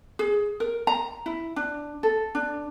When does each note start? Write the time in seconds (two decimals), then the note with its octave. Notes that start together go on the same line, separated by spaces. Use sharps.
0.19 G#4
0.60 A#4
0.87 A#5
1.26 E4
1.56 D4
2.03 A4
2.35 D4